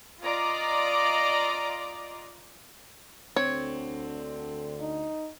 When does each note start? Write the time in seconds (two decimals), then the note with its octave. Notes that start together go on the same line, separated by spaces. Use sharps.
0.22 F4 D5 D#5 A#5 D6
3.36 D2 D3 C4 C#5
4.80 D#4